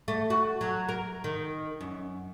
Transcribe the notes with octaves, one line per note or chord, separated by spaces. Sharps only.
A3
F#4
F#3
A#4
D#3
F#2